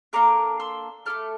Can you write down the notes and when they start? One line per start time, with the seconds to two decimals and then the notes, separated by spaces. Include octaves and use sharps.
0.13 A#3 D4 A4 A#5 D6
0.60 C6 E6
1.06 A3 E4 A4 D6 F6